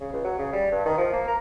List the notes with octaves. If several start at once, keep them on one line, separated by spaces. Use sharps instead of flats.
C#3
C#2
F#3
C#3
G3
G2
D#3
F3
A#3
A#4